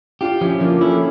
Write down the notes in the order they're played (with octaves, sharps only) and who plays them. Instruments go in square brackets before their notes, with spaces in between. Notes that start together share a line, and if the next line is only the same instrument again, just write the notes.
[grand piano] D4 F4 [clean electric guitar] G4
[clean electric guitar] F3 [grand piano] C#4 E4
[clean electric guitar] F3 [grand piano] A#3 D4
[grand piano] A3 C#4 [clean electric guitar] E4